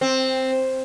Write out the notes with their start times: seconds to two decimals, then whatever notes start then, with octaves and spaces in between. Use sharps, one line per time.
0.01 C4